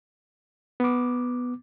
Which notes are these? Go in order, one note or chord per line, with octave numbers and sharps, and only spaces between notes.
B3 D6